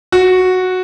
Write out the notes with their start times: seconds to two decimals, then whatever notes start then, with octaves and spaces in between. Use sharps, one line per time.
0.12 F#4